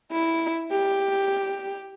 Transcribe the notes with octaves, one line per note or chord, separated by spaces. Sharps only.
E4
G4